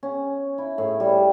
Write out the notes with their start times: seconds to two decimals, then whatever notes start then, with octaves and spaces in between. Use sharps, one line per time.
0.03 C#4
0.58 E4
0.78 A2
1.00 G3